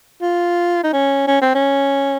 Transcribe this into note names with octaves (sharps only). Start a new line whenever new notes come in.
F4
D#4
C#4
C#4
C4
C#4